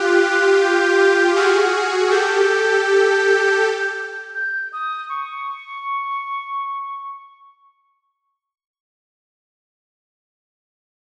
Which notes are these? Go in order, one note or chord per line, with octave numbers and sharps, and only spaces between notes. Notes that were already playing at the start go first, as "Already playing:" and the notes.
Already playing: F4 G4 F#6
G6
F#4 G#4 F6
G4 A4 G6
G6
G6
D#6
C#6